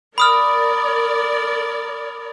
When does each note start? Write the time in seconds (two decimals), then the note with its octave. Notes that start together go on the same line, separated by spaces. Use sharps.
0.18 A#4 D5 B5 D#6 F6